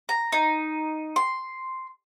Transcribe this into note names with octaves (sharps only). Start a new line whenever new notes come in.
A#5
D#4
C6